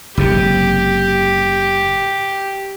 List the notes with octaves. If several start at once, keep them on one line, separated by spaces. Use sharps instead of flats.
F#1 G#2 C3 G4